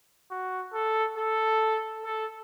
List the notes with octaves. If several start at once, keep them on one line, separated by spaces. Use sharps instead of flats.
F#4
A4
A4
A4